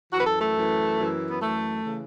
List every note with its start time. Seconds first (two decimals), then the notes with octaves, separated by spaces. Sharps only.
0.13 F#2 E3 F#4
0.20 B4
0.27 A4
0.41 A3
0.55 F#2 E3
0.98 F#2 E3
1.30 B3
1.41 F#2 E3 A3
1.83 C#3 E3